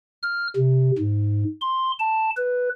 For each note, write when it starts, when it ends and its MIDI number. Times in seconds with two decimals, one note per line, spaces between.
0.23 0.48 89
0.57 0.91 48
0.99 1.44 44
1.61 1.91 84
1.99 2.30 81
2.37 2.69 71